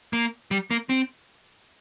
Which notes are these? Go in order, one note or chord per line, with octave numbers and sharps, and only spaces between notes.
A#3
G3
A#3
C4